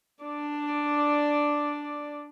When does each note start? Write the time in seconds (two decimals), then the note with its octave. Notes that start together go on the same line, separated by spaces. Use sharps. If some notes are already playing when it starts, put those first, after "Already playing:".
0.24 D4 D5